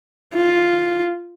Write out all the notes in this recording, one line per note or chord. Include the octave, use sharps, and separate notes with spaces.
F4